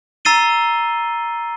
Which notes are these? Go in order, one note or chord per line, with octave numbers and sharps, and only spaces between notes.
A#5 E6 A6 C7 D#7 G7